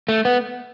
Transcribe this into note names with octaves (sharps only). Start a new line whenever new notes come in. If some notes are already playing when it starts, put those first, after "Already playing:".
A3
B3